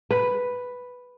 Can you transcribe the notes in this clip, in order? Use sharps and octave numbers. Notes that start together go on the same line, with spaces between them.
B4